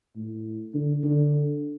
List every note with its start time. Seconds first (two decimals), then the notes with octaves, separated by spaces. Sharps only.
0.16 A2
0.74 D3
1.03 D3